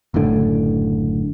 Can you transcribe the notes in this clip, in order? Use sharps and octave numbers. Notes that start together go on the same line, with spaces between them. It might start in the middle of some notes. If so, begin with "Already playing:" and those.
F#1 F#2 A2 D3